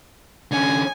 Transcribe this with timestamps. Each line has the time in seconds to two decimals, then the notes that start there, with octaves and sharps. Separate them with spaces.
0.51 D3 C#4 G#5